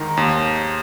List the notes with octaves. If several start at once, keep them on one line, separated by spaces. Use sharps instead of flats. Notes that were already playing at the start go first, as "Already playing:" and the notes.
Already playing: G#2 D#3 A#5
D#2